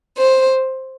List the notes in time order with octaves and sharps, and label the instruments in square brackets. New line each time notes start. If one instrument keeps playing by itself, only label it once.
[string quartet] C5